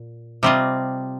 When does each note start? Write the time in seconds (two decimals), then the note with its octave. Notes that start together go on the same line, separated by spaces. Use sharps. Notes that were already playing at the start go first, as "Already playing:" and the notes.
Already playing: A#2
0.43 C3 G3 C4 F4 D#5